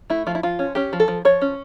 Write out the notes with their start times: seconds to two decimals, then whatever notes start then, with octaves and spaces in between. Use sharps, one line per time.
0.10 A3 E4
0.27 F3 F4
0.35 E4
0.43 F3 F4
0.59 C#4
0.75 C#4 G4
0.93 F3
1.00 A4
1.08 F3
1.25 F3 C#5
1.41 C#4